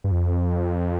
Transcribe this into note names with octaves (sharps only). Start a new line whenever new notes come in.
G2
F2